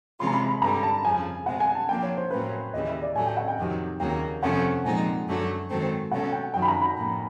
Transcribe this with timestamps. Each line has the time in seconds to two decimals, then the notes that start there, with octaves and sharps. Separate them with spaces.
0.20 C3 E3 G#3 C#4 F4 C6
0.27 A#5
0.33 B5
0.48 B5
0.62 G2 D3 G3 B3 A#5
0.83 A5
1.04 F2 C#3 F3 G#5
1.46 B2 G#3 C4 F#5
1.60 G#5
1.75 A5
1.88 F3 A#3 D4 F4 G5
2.03 C#5
2.17 C5
2.31 A2 F#3 A#3 C#4 B4
2.74 D#2 C#3 E3 G3 D#5
2.87 E5
3.02 D5
3.15 A2 F#3 A3 G#5
3.26 G5
3.37 F#5
3.48 G5
3.58 F2 C3 D#3 F#3
4.00 D#2 C#3 F#3 A#3 G5
4.42 F2 C3 F3 A3 C#4 F#5
4.84 A#2 F3 G#3 C4 D#4 G#5
5.27 F#2 D3 F#3 A3
5.69 G#2 D#3 F#3 A3 C4
6.11 B2 F#3 A3 C#4 F#5
6.32 G5
6.54 F#2 D#3 F#3 G5
6.62 B5
6.68 A#5
6.82 B5
6.96 A2 F3 A#3